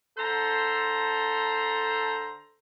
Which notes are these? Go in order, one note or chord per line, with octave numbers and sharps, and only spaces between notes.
D3 A4 C5 A#5 C6